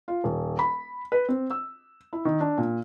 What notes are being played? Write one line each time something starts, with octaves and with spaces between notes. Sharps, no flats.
F4
D#1
B5
B4
C4
E6
E4
D#3
D4
A#2